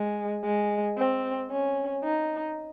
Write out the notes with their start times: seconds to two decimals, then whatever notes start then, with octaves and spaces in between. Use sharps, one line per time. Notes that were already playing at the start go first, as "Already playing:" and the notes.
Already playing: G#3
0.44 G#3
0.97 C4
1.51 C#4
2.04 D#4